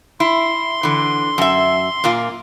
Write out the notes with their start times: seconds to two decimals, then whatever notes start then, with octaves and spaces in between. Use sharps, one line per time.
0.20 E4 C6
0.83 D3 E3
1.38 F#2 E5
2.04 A#2 A#3 F4